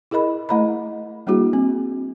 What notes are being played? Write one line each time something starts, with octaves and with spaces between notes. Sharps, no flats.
E4 G#4 A#4 D#5 B5
A3 E4 D#5 A#5 B5
G3 A#3 D4 E4 F#4 G#4
C4